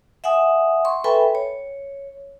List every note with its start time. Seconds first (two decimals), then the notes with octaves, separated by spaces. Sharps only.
0.24 E5 F#5 G#5 D#6
0.85 C6 C#6
1.04 A4 B4 E5 G5 G#5 B5
1.35 C#5